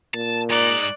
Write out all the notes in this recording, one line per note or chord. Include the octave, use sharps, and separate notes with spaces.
A#2 A5
G#3 D#4 D5 F#6